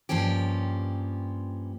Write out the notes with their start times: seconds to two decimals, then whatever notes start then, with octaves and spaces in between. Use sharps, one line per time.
0.09 G2 F3 A#3 C#4 G4